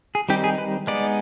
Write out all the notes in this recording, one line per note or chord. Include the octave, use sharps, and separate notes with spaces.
G#4
D#3 G3 C4 D#4 G4
G#4
B4
G#3 B3 D#4 D5